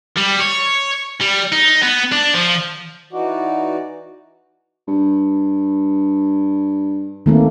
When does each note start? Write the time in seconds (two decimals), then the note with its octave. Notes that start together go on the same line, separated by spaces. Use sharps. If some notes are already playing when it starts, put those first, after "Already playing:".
0.17 G3
0.40 C#5
1.21 G3
1.52 D#4
1.83 B3
2.12 D4
2.34 F3
3.13 E3 D#4 F#4 D5
4.88 G2
7.26 G#1 D#3 A3 A#3